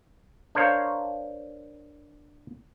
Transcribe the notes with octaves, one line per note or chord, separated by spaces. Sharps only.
D4 A#4 C5 C#5 F5